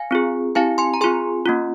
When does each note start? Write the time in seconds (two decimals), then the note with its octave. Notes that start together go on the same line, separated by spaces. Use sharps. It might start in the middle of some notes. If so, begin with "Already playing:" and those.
Already playing: F5 G#5
0.11 C4 F4 G#4
0.55 C4 E4 G4 F5 G#5
0.78 G#5 C6
0.94 A#5
1.01 C4 F4 G#4 G#5 C6
1.46 A#3 C#4 F4